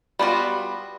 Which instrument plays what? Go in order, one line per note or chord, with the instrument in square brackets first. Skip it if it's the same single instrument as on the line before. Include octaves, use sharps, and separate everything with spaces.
[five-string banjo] G3 B3 D#4 F4 F#4